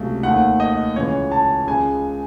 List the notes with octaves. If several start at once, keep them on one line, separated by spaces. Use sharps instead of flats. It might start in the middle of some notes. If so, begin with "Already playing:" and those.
Already playing: C#2 C3 F#3 A3
D#2 D#3 A3 F#5
D#5
C#2 C#3 E3 C#5
A5
C#2 C#3 G#3 G#5